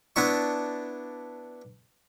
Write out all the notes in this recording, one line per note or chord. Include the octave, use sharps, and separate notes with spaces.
B3 D4 E4 C#6